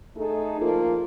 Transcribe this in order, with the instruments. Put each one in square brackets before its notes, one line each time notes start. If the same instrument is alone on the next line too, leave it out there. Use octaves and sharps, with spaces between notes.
[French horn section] A3 D#4 G#4 A4
F3 A#3 F4